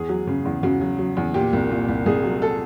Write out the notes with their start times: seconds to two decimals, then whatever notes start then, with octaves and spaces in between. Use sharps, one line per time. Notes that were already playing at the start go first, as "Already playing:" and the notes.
Already playing: E2 G#4
0.09 F#3
0.27 C#3
0.45 E2
0.63 C#3 F#4
0.81 F#3
0.98 F#3
1.17 E2
1.34 A#2 G4
1.53 C2
1.70 A#2
1.88 C2
2.06 C2 G#4
2.24 F#3
2.42 A4